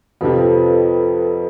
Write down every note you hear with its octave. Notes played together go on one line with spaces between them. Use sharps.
F2 C3 F3 A4 B4